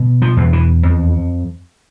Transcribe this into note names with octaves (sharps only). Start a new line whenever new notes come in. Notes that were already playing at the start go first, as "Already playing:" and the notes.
Already playing: B2
F3
E2
E3
F2